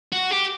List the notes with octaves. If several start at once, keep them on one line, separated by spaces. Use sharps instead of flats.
F#4
G4